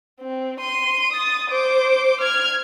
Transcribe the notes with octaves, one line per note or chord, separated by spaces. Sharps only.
C4
C6 D#7
D#6 A6
C5 D6
F6 G#6